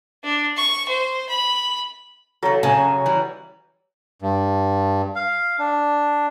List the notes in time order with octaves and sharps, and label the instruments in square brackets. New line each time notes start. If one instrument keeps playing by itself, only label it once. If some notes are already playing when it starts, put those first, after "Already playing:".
[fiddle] D4
C#6
C5
B5
[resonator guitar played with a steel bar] C#3 A4 [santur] F#3
[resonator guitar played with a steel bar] F#2 C#4 A5 [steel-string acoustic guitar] C#3 [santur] G#5
[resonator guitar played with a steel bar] E3 G3
[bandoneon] G2
F5
D4